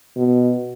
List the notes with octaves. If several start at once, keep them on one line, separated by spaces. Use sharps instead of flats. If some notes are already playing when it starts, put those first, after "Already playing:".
B2